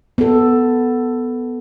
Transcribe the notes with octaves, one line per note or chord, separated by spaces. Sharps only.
B3 A4